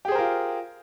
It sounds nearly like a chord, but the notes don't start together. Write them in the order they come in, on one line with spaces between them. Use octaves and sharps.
G4 G#4 C5 A#4 F4